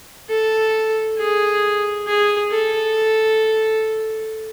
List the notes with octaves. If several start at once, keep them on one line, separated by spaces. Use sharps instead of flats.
A4
G#4
G#4
A4